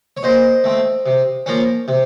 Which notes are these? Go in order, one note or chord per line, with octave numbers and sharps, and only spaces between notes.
C#5
A#2 C5 D#5
A3 C4
C3
F3 A#3 C#4
C3